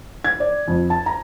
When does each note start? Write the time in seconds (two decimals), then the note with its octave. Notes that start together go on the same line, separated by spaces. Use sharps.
0.24 G#6
0.40 D5
0.68 F2
0.90 A5
1.06 A#5